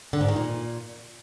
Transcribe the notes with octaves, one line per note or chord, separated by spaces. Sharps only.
D3
G#2
D#3
A#2